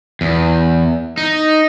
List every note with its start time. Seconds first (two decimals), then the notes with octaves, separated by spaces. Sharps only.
0.21 E2
1.18 D#4